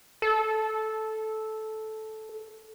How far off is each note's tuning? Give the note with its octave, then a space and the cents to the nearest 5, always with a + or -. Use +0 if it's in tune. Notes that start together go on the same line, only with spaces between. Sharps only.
A4 -10